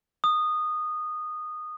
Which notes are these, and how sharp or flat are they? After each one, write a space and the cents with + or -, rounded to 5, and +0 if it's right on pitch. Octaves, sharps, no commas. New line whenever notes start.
D#6 -15